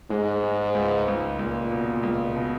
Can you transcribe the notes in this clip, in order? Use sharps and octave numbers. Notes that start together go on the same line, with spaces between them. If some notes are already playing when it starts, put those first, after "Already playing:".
G#2 G#3
G#3
C#2
C#2
C#2 A#2
B2
C#2
B2